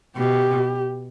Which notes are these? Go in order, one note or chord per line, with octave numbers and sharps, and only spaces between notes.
B2 G4